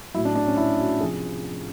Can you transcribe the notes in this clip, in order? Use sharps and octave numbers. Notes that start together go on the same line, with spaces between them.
A2 F#3 E4
D4
D4
C#4
E4
F#4
C3 F3 G#4